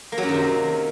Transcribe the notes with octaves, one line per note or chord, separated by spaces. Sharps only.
A#3
F#3
F#2
D#3
C3